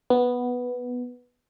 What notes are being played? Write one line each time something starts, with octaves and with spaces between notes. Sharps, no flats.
B3